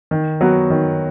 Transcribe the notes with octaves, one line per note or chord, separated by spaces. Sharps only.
D#3
F#3 B3 F#4
D#3